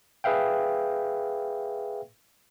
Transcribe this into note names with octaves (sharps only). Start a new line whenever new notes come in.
G#4 B4 E5 F5 G5